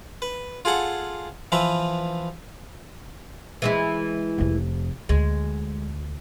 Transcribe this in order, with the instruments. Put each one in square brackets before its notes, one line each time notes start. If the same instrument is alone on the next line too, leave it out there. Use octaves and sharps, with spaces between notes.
[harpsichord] B4
F4 G#4 A4 F#5
E3 F3 B4 E5
[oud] E3 G#3 E4
[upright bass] F1 F2
[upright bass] D2 [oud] G#3